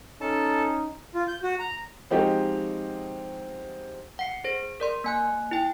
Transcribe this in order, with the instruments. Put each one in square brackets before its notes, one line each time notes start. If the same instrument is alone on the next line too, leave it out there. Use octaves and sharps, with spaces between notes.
[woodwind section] C#4 [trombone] D#4 [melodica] A4 A5
[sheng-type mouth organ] F4
G6
F#4
A#5
[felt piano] F3 G#3 C4 D#4 F#4 G4
[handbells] F#5 C7 C#7
G#4 C5 A#6
A#4 D5 C6
A#3 G#5 F#6
E4 G5